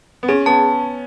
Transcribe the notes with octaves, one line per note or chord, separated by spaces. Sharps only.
B3
C#4 G#4
B3 A5